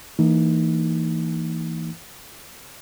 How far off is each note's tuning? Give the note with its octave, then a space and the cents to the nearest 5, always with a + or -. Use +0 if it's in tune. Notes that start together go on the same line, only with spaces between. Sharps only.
E3 +0 A#3 -30 D#4 +0